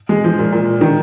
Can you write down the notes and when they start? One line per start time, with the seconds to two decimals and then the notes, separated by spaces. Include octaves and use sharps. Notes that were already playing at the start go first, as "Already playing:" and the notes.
0.09 G#3
0.24 F3
0.39 A#2
0.52 A#2
0.81 D#3